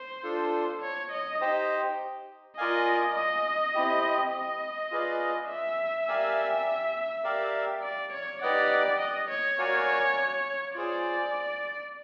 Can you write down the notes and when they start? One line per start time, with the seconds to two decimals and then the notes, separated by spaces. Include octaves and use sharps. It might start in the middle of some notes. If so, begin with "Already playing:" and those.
Already playing: C5
0.23 D4 F4 A4
0.82 C#5
1.11 D#5
1.41 D#4 G4 C5 D#5 G5
2.57 F4 A#4 D5 D#5 F5 G#5
3.16 D#5
3.75 C4 E4 G4
4.33 D#5
4.91 F4 G#4 B4 D5 F5
5.49 E5
6.08 G4 A#4 D5 F5 G#5
7.24 G4 A#4 D5 F5
7.83 D5
8.12 C#5
8.41 D#4 G4 B4 D5 D#5 F#5
9.00 D#5
9.30 C#5
9.58 F#4 A#4 D5 F5 G#5
10.75 F4 G#4 C5 D5